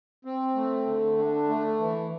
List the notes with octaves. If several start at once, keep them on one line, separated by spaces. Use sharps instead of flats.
C4
A3
D3
D4
A3
E3